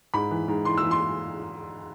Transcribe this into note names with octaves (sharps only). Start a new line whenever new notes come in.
G#2 B5
E3
G#2
E3 C6
E6
E3
C6